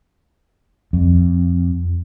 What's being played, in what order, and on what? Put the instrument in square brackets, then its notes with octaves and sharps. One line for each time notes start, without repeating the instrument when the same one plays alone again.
[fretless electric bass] F2